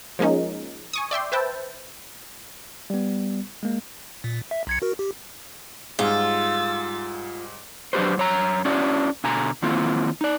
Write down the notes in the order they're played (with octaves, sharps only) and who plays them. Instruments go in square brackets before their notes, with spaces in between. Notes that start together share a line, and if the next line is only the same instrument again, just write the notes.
[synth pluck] F3 G#3 A#3 C#4 D#4
G#5 C#6 D#6
D5 E5 G5 C6
B4 C5 E5 G5 A5
[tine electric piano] G3 B3
G#3 A#3
[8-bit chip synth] A#2
E5
B1 G#6 C#7
F#4 A#4
G4
[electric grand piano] G#2 G3 G#4 [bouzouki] F4 [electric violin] E6 A6
[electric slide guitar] F#3 D4 F4 G4 B4 C5
F#2 C#5 A#5
C#4 D4 E4 F#4 D5
B2 D3 G#5 A#5
D#3 A#3 C4 E4 F4
D#4 D5